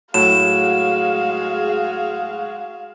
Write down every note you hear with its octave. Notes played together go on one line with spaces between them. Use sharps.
A2 F#3 G#3 F#4 G#4 F5 E7